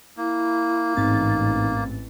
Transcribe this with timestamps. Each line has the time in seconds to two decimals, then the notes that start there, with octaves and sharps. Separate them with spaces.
0.17 A#3 E4
0.97 A1 G#2 E3 C4 D#4 A6